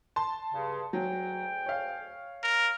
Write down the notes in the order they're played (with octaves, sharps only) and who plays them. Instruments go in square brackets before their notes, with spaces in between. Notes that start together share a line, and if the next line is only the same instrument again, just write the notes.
[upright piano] A5 C6
[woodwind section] G2 C#3
[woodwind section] D2 G#4 G5 [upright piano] F#3
[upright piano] C#5 F5
[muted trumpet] A#4